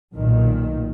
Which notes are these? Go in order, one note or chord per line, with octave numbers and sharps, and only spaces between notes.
B1 A#2 D#3